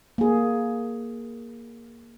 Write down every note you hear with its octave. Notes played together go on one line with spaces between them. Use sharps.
A#3 G#4